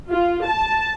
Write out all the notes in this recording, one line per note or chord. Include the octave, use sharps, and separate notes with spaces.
F4
A5